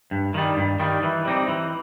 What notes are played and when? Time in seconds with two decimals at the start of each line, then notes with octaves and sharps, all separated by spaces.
0.11 G2
0.34 D#3 G3
0.57 G2
0.80 D#3 G3
1.03 E3
1.25 G3 C4 D#4
1.48 E3